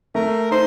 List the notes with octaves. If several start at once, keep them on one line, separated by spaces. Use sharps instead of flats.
A3 A#4
D#4 C5